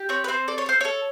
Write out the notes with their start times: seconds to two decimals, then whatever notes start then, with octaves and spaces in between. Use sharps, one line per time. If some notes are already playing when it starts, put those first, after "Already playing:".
Already playing: G4
0.09 C4 C#5
0.24 B4
0.28 C4 C5
0.48 A4 D5
0.58 C#5
0.66 A4 C5
0.81 A4 C#5